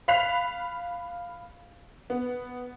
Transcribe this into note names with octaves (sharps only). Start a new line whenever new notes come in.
F5 B5 F#6 B6 C7 F7
B3